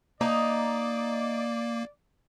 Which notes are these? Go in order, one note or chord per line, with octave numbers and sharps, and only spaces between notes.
A#3 D#4 D5